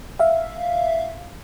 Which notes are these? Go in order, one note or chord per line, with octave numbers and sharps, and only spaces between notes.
E5 F5